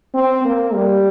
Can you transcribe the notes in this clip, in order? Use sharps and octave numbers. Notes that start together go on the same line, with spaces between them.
C4
A#3
G3